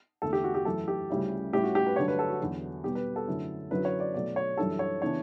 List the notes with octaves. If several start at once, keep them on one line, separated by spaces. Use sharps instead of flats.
E2 D3 A3 A4
G4
F#4
G4
F#2 E3 A3 A4
G4
D2 C#3 G3 C#4 E4
A2 G3 C#4 E4 G4
F#4
G4
B4
G2 D3 F#3 A3 D4 C#5
B4
A4
F#4
E2 D3 F#3
B2 G3 B3 G4
B4
A4
F#2 D3 A3 C#4 E4
F#2 D3 F#3 C#4 E4 B4
C#5
D5
B2 F#3 A3 D5
C#5
F#2 E3 G3 D4 A4
C#5
C#3 E3 B3 D4 C#5